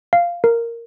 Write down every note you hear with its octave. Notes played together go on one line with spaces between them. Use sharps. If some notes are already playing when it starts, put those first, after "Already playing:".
F5
A#4